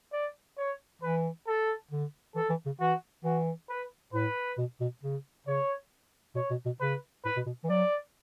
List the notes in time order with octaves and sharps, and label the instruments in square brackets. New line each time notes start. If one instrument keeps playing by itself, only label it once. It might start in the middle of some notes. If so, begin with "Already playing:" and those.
[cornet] D5
C#5
[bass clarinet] E3 [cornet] B4
[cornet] A4
[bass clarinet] D3
[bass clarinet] E3 [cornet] A4
[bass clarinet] E3
C#3
[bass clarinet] E3 [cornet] F#4
[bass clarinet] E3 [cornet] F#4
[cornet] B4
[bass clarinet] A2 [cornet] B4
[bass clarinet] B2
B2
C#3
[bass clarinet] C#3 [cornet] C#5
[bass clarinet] B2 [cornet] C#5
[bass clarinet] B2
B2
[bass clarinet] C#3 [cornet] B4
[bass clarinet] A2 [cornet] B4
[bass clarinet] B2
B2
E3
[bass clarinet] F#3 [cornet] D5